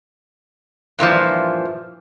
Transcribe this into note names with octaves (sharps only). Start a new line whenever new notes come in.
G2 A#2 E3 F3